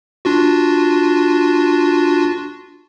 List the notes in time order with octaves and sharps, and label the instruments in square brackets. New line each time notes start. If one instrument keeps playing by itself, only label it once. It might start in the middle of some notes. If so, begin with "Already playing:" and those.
[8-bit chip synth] D4 F4 F#4